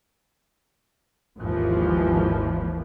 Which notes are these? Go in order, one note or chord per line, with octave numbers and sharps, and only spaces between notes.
G#1 D#2 E3 F3